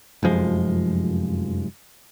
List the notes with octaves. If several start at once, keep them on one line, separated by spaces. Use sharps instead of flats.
F1 F#2 F3 G#3